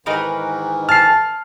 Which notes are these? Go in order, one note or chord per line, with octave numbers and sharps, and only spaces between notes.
G#2 D#3 E3 D#4 A#4 B4
A5 F6 C7